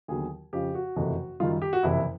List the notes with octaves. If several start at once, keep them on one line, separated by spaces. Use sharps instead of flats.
D#2 D3 F#3 B3 G#4
F2 C#3 F3 G4
F#4
F#1 F2 C3 E3 A3
F#2 D#3 G3 F4
G4
F#4
F#1 F2 C3 E3 E4